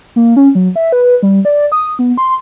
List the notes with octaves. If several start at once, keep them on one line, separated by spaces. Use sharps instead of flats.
A#3
C#4
F#3
E5
B4
G3
D5
D#6
B3
C6